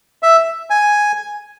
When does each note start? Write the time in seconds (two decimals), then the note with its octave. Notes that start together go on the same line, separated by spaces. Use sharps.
0.23 E5
0.70 G#5